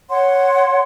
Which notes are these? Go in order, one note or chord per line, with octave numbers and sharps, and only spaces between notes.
C#5 F#5 C6